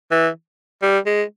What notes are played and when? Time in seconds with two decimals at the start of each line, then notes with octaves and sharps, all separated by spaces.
0.11 E3
0.82 G3
1.06 G#3